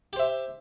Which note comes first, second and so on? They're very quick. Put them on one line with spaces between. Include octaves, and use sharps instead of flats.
G4 C5 E5